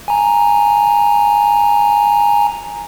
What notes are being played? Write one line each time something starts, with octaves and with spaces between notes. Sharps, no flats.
G#5 A#5